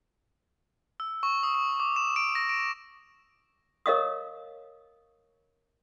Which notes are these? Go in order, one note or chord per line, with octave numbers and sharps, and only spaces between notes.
E6
C#6
D#6
C#6
D6
E7
D7
A#6
D7
A#4 C#5 D#5 F5 C#6 D#6